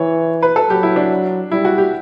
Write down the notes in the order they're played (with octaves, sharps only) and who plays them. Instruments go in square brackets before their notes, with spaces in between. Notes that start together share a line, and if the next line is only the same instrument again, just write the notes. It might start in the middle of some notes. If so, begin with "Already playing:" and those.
Already playing: [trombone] E3 [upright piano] C#5
[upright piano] B4
A4
[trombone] F#3 [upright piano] G4
[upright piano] E4
D4
[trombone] G3 [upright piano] E4
[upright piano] F#4
G4